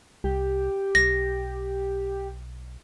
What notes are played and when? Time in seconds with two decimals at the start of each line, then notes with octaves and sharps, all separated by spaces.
0.24 C2 G4
0.95 B1 A#6